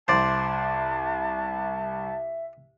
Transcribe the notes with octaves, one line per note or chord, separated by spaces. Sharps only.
C2 C5 D5 E5 A5